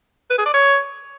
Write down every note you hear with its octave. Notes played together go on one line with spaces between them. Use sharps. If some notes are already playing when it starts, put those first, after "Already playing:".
B4
G#4
D5
C#5